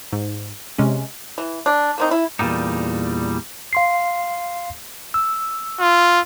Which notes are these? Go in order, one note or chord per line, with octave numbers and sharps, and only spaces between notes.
G#2
C3 G#3 C#4
E3
D4
A#3 C4 D#4
E4
E2 G2 A#2 G3 D#4
F5 C6 C7
E6
F4